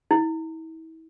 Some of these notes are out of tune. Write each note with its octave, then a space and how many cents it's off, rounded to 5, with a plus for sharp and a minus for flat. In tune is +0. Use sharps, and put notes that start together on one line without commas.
E4 -35